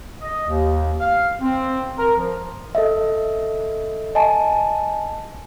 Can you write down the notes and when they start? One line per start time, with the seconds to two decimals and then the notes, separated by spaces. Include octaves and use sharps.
0.21 D#5
0.47 D#2
0.99 F5
1.41 C4
1.98 A#4
2.16 F3
2.75 A4 D#5 E5
4.15 D#5 G#5 A5